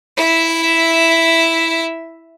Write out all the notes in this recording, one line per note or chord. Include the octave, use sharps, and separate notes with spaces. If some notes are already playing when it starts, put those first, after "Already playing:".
E4 E5